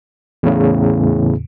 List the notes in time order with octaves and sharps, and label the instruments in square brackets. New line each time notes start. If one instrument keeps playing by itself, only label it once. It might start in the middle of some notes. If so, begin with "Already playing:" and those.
[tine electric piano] E2 A2 C#3